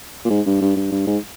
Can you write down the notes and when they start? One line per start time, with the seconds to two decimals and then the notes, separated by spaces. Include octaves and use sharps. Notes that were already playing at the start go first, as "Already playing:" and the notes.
0.25 A#2
0.30 G#2
0.46 G2
0.61 G2
0.76 G2
0.91 G2
1.07 G#2